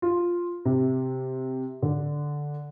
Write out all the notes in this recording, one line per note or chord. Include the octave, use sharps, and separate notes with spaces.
F4
C3
D3